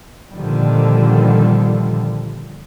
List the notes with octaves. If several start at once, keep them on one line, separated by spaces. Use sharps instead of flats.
A#2 D3 D#3 F3 G3